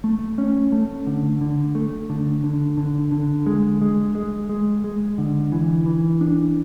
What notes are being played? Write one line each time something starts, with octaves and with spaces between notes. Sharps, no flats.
A3
C#4
A3
D3
D3
A3
D3
D3
D3
D3
G#3
G#3
G#3
G#3
G#3
D3
E3
E3
D4